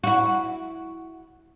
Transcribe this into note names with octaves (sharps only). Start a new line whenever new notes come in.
E4 F#4